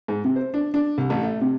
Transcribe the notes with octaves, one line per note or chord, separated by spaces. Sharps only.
G#2
C3
C5
D4
D4
C2
A1
A3
C3